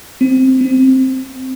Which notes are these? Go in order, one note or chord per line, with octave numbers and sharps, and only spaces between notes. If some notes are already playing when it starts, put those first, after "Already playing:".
C4
C4